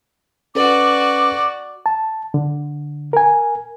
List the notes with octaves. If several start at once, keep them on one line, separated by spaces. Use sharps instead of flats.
C#4 F#4 A4 B4 D5 D6
A5
D3
A#4 G#5